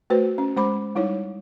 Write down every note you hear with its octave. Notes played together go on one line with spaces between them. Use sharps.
A3 F#4 B4 C5
C#4
G#3 C5 B5 D6
G3 D#4 E4 C#5